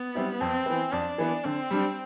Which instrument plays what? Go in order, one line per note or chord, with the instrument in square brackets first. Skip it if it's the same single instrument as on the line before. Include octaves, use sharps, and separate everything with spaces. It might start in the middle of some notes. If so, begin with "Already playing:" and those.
Already playing: [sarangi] B3
[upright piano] G3 C4 E4
[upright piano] F2 [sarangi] C4
[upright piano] E3 B3
[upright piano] F2 [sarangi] D4
[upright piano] E3 B3
[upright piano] D3 [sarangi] C4
[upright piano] G3 D4